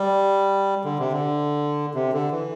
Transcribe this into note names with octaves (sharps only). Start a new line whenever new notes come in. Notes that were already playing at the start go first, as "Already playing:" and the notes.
Already playing: G3
D3
C3
D3
C3
D3
E3